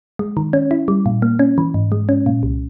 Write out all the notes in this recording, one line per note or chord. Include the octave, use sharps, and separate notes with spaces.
G#3
D#3
C#4
E4
G3
A#2
A#3
C#4
E3
G#2
G#3
C#4
A#2
C2